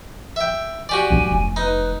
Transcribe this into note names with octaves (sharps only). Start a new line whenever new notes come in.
E5 G5
F#4 G4 D5 G#5
F#2 D4
F1
D#4 B4